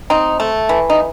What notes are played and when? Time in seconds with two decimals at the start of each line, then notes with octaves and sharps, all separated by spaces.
0.10 C4 D#4
0.40 A3
0.69 E3
0.90 D#4